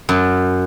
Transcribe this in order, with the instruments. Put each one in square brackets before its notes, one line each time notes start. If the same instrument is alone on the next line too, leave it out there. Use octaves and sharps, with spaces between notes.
[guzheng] F#2